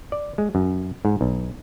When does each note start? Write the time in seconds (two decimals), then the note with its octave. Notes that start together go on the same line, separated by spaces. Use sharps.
0.12 D5
0.38 G#3
0.55 F#2
1.05 G#2
1.21 B1